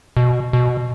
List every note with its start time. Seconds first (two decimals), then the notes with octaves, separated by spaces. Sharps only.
0.17 B2
0.53 B2